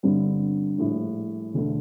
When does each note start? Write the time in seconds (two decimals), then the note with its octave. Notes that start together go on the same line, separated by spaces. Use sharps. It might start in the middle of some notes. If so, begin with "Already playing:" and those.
0.03 G1 G2 D3 G3 C4
0.78 A#1 A2 G3
1.54 E1 D2 D3 A3